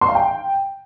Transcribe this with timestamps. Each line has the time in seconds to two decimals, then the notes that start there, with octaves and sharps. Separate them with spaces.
0.01 C6
0.08 F5
0.15 G5